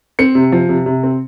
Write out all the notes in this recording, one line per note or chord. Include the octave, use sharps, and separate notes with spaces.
C4 C#7
C3
F3
C3
C3
C4